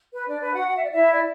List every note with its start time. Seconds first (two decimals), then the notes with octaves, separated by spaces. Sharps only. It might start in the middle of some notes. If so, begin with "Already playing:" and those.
0.14 B4
0.27 D4 D5
0.40 B4
0.53 F#4 F#5
0.68 F#5
0.75 E5
0.84 D5
0.92 E4 E5
1.13 D5